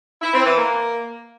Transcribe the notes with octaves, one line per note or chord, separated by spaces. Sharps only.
E4
C4
E3
A#3